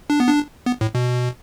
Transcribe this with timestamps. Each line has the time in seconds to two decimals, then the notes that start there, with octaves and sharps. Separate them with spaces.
0.10 D4
0.20 B3
0.29 D4
0.66 B3
0.81 A2
0.95 B2